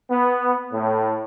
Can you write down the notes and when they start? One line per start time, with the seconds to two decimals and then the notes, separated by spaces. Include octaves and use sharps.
0.10 B3
0.72 A2